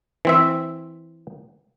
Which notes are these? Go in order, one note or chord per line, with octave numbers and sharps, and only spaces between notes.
E3 C4 E5